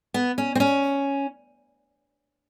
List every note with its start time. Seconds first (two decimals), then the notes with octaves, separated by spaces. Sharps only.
0.14 B3
0.38 C#4
0.55 C4
0.60 C#4